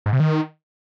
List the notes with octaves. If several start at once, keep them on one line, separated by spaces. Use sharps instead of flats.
G#2
C3
D#3